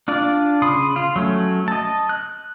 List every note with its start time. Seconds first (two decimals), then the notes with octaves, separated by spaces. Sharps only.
0.08 D4 F4 D5
0.62 C#3 B5 C6 D#6
0.96 F4
1.16 F#3 A3 C#4
1.68 D#5 A5
2.09 F#6